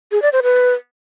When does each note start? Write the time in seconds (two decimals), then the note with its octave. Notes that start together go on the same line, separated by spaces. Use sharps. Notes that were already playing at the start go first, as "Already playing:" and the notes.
0.12 G#4
0.22 D5
0.33 C5
0.43 B4